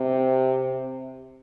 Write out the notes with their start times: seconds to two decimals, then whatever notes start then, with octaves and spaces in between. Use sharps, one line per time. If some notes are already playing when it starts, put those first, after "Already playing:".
Already playing: C3